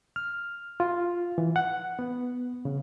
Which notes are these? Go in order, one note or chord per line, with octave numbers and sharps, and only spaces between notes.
F6
F4
E3
F#5
B3
C#3